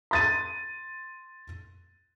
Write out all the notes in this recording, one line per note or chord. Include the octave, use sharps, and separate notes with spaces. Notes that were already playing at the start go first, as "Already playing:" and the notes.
C6 A6 D#7